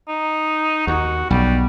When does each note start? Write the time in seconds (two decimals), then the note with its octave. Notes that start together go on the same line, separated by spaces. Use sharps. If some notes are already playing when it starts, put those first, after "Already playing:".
0.08 D#4
0.87 D#2 F#4
1.30 B1 G3